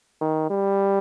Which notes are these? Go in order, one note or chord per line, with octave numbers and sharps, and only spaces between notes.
D#3
G3